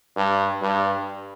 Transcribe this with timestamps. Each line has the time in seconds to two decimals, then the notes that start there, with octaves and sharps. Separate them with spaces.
0.16 G2
0.62 G2